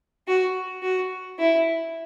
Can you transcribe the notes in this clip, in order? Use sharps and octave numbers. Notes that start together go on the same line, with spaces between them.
F#4
F#4
E4